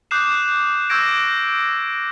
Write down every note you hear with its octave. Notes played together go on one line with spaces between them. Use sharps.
D6 D#6 F#6 G6 C7 E7
C#6 E6 G6 G#6 A#6 D7